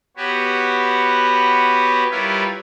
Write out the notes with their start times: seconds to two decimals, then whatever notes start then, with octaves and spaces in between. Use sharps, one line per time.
0.17 B3 F#4 G4 B4 C#5
2.10 G3 E4 F4 A#4 B4 C#5